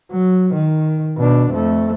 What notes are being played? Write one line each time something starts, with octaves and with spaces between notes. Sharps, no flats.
F#3
D#3
B2 D4
F2 A3